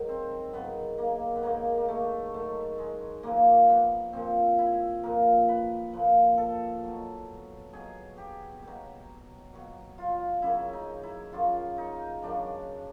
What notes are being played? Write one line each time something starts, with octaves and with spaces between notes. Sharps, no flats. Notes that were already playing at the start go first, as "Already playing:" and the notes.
Already playing: G#2 D#3 F#3
C4
G#2 D#3 F#3 B3
A#3
B3
G#2 D#3 F#3 A#3
A#3
A3
G#2 D#3 F#3 A3
G#3
A#2 F3 A#3
B3
A#2 F3 C4
E4
A#2 F3 A#4
B4
A#2 F3 B4
A4
B2 F#3
B2 F#3 G#4
G4
B2
F#3
B2 F#3
F4
F#2 C#3 F#3 E4
D#4
E4
F#2 C#3 F#3 F4
D#4
F#2 C#3 F#3 D4